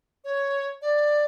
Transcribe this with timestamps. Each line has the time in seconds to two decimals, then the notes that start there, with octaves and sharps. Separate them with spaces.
0.24 C#5
0.82 D5